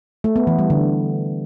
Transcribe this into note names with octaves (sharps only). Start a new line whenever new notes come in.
A3
B3
E3
G3
D3